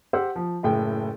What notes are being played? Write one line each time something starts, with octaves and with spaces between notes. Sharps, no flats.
G4 C5 F#5 E6
F3
F#1 A2 G5